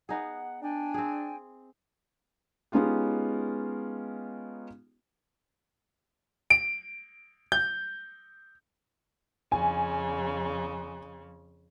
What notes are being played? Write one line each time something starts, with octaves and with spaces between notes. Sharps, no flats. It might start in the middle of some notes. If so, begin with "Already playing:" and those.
B3 D#4 G#4 F#5
D4 G5 G#5
C4 G#4
G#3 B3 C#4 D#4 F4 G4
D7
G6
F2 C#3 G#5